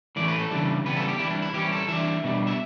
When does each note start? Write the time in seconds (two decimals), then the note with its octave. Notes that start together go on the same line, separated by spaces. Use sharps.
0.16 A2 E3 A3 C#4 D5
0.28 B4
0.38 A4
0.51 C#3 E3 G3 D4
0.85 C#3 E3 G3 B3 B4
0.96 A4
1.08 G4
1.19 E3 G3 D4 E4
1.31 D4
1.42 E4
1.54 E3 G3 C#4 G4
1.72 A4
1.88 E3 G3 D4 E5
2.24 B2 G3 D4
2.47 E5